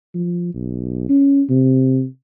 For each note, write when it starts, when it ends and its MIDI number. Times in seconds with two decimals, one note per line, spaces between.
0.14 0.50 53
0.54 1.08 35
1.09 1.42 61
1.50 2.06 48